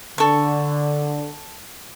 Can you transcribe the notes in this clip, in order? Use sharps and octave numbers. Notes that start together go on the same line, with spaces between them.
D3 A4 C#6